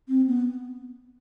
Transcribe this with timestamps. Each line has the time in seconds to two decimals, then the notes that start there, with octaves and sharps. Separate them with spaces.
0.09 C4
0.27 B3